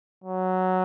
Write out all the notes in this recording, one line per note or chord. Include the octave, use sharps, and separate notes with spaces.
F#3